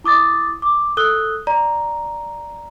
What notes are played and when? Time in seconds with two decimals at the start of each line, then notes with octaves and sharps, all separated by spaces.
0.04 E4 D6 D#6 A6
0.62 D6
0.97 A4 D#6 E6 F#6 G7
1.47 D5 A#5